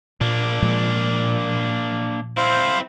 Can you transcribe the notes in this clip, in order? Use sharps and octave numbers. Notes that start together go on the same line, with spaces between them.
A#2 A#3 D4
A#2 F3 G#3
C4 E4 C5 F5